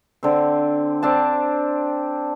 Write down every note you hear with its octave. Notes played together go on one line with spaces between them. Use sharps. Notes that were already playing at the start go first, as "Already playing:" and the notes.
D3 C4
C4 D4 A5